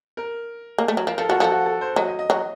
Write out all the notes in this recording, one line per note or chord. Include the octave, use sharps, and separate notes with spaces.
A#4
A#3
A3
F#3
F3 A#4
F3 A4
F3 F#4
F3 A4
F#4
A4
C5
F#3 D#5
D#5
D#5
F#3